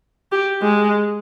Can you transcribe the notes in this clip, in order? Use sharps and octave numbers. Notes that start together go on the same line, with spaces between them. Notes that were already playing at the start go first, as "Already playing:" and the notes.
G4
G#3